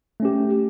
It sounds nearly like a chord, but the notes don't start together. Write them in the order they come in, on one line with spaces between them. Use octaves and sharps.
A3 C#4 G4